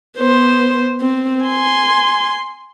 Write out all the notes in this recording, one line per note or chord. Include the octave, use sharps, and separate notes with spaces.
B3 C5
C4
G#5 C6